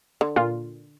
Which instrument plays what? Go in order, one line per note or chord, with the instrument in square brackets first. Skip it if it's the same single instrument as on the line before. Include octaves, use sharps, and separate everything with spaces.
[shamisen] D3
[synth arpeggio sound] A#2 F4